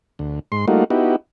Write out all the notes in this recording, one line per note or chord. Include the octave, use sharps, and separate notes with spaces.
D2
G#2 C6
G3 A3 A#3 D#4 F4 F#4
B3 D#4 E4 F#4 G4